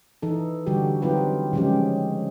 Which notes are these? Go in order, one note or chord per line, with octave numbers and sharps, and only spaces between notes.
E3 D#4 A4
D3 G3 F#4 G4
F#3 C4 D#4 F4 G4 B4
C#3 F3 F#3 G#3 C#4 G4